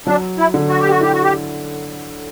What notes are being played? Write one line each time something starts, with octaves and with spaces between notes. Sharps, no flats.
F#3 D4
E4
D3
F#4
G4
F#4
E4 G4
F#4
G4